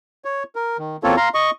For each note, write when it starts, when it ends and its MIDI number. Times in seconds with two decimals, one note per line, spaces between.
0.25 0.43 73
0.55 0.77 70
0.79 0.97 51
1.03 1.16 40
1.03 1.16 58
1.03 1.16 60
1.03 1.16 65
1.03 1.16 69
1.03 1.16 73
1.17 1.29 77
1.17 1.29 82
1.17 1.29 84
1.34 1.51 75
1.34 1.51 85